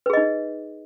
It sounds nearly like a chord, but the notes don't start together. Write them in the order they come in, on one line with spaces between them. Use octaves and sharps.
B4 G#4 D#5 D#4